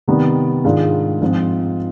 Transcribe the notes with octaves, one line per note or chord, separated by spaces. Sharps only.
C3 D#3 G3 B3
G#2 D#3 G#3 D4 F4
G#2 F3 C4 F4